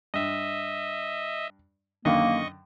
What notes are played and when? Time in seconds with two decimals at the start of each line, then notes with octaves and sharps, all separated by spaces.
0.14 G2 D#5 E5
2.05 F#2 D3 D#3 A#3 D#5 C#6